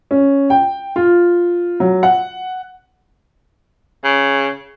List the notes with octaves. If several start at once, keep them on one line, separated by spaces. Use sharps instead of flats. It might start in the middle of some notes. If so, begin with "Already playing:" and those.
C#4
G5
F4
F#3
F#5
C#3